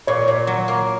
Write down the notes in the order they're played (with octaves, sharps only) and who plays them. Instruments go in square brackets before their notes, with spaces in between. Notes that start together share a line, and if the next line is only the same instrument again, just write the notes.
[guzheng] A#2 [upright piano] C#5
[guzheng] A#2
F#3
A#3